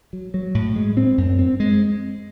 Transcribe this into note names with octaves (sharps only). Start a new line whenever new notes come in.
F#3
F#3
A2
G#3
C4
F#2
C4
G#3